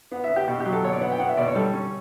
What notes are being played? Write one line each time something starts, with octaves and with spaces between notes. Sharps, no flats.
B3 F#5
E5
B3
G4
B2
G4
F#3
A4
B2 C#5
D5
B3 F#5
G5
B3 F#5
E5
B2 D5
C#5
G3 A4
C#4